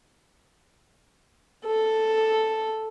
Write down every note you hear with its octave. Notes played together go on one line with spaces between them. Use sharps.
A4